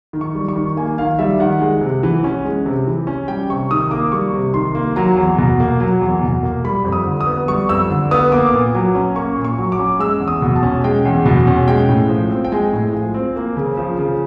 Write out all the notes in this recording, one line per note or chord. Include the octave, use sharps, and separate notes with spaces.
D#3
C#6
G3
C#6
D#3
A#3 G#5
D#3 F5
G3 E5
D#3 F#5
G#3
C3
E3
C#4
G#3
C3
E3
C#4
G3 G5
C3 C#6
D#3 D#6
A#3 D6
G3 C#6
C3
D#3 C6
A#3
F#3 A#5
E2
B2
A#3
F#3
E2
B2
A#3
G3 B5
F2
D#6
D3
D#6
B3
G3 C#6
F2 E6
D3
B3 D#6
A#3 D6
A#2
F#3
C#4
A#3 C#6
A#2
C#6
F#3
D6
C#4
G#3 E6
E2
D#6
B2
A5
C#4
G#3 G5
E2
B2
C#4
G#3 G5
A2
F3
C4
G5
G#3 G#5
A2
F3
C4
A#3
C#3
F3
C#3